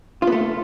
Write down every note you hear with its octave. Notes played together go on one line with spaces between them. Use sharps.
F4
B3
A3